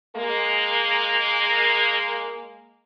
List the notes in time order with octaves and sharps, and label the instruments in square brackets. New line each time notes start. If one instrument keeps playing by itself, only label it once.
[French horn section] G#3 A#3